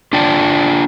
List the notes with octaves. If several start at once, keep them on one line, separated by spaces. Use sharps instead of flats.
D4 F4 D5 G5 A5